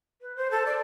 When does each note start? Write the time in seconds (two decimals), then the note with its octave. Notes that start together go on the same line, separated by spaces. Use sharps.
0.21 B4
0.36 C5
0.50 A4
0.65 D5